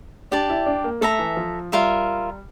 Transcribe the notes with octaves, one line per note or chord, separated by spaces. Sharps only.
D4 G4 D5 A5
E4
D4
A#3
A3 A4 E5 A#5
E3
F3
G3 F4 A#4 E5